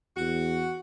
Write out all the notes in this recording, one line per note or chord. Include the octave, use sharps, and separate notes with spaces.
E2 F#4